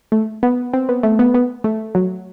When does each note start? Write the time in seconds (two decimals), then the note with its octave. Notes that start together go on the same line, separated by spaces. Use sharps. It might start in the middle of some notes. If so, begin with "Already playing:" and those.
0.12 A3
0.43 B3
0.73 C4
0.89 B3
1.03 A3
1.19 B3
1.34 B3
1.64 A3
1.95 F#3